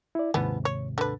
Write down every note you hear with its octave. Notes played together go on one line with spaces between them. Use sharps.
E4 D5
D#2 G#2 C3 E3 F3 B3
C#5
D3 B4